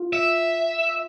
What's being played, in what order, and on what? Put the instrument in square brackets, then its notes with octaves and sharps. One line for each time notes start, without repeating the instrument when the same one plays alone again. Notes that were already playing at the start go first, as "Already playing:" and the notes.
Already playing: [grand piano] F4
[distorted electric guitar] E5